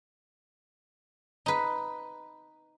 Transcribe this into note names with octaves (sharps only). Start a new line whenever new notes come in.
D#4 B4